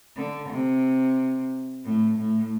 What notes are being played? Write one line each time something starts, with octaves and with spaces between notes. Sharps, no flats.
D3
C3
A2
A2